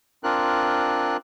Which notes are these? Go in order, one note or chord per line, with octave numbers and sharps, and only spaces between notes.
C4 D4 F4 A#4 F#6